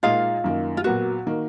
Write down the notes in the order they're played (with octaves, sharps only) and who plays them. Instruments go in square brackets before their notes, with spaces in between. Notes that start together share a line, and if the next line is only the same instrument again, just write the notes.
[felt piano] A#2 G#3 D#4 [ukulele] F4 F5
[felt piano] F#2 D#3 A#3
[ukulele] F4
[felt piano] A#2 F#3 B3 [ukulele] F#4
[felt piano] D#3 A#3